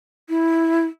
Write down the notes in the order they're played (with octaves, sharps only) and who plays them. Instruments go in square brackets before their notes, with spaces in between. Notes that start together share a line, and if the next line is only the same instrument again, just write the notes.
[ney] E4